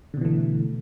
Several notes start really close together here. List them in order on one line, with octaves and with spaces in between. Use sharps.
D3 B2 E3 A3